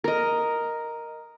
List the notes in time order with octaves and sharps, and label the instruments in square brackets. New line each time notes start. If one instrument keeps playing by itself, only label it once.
[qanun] A#4 D#5